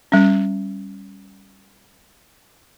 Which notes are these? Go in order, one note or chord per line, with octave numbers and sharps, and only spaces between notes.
G3 C#4